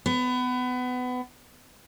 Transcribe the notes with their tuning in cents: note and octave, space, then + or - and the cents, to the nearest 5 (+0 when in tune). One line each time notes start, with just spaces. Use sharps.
B3 +25